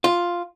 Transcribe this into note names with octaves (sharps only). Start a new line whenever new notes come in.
F4